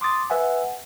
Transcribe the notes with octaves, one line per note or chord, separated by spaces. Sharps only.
C6 D6 D#6 A6
B4 E5 F#5 G#5